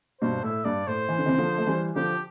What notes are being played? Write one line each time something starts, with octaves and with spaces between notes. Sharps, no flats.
G2 B2 C5
A2 E5
G2 D5
A2 C5
E3
D3
C3 E3
D3 F3
A3
E3 G3
D3 F3 G4